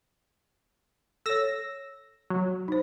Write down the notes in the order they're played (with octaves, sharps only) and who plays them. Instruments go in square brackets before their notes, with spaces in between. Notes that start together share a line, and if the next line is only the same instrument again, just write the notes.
[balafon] A4 C#5 [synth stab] E6 A#6
[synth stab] F#3
[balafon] D#4 C5